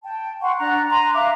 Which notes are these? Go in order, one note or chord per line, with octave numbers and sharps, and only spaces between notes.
G5 A5
F#5 G5 C6 C#6
D4 F#5 A#5 F#6
G#5 A#5 C6
E5 F5 D6 F#6